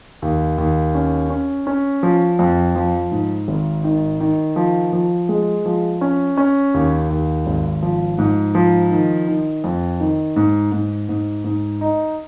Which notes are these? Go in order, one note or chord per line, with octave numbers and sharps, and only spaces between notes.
D#2
D#2
C#4
C#4
C#4
F3
F2
F3
G#2
G#1
D#3
D#3
F3
F3
G#3
F3
C#4
C#4
D#2
D#2
G#1
F3
G#2
F3
D#3
D#3
F2
D#3
G#2
G#2
G#2
G#2
D#4